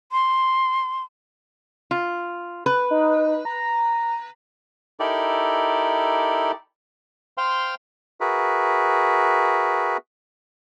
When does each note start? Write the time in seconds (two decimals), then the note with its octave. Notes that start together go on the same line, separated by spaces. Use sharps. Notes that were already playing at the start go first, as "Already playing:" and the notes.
0.12 C6
1.91 F4
2.66 B4
2.91 D#4
3.45 A#5
5.00 D#4 E4 G4 A4 A#4 D5
7.38 C5 F5 G5 C6
8.20 F#4 G#4 A#4 B4 E5